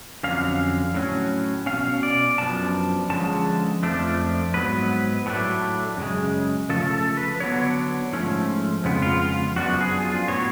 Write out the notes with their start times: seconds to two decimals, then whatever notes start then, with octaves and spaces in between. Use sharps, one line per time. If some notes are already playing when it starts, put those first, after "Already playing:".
0.23 F2 D3 F#3 C#4 F5
0.95 A2 F#3 C#4
1.66 B2 G#3 C#4 F5
2.03 D5
2.38 F#2 F3 B3 D4 A5
3.10 D3 F3 G#3 C#4 A5
3.82 F2 F3 A3 D4
4.54 G#2 F#3 B3 B4
5.26 A2 F#3 A3 D4
5.97 F#2 C#3 G#3
6.69 C#3 F3 A3 A4
6.93 A4
7.17 B4
7.40 D3 F#3 B3 D4 C#5
8.13 G#2 F3 A3 C#4
8.84 F2 C#3 G#3 B3
9.02 F4
9.20 F4
9.56 F#2 F3 B3 D4 F#4
9.81 G#4
10.04 F4
10.28 A2 F#3 B3 C#5